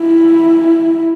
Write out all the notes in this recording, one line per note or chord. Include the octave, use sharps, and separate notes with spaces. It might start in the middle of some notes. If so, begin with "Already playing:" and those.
Already playing: E4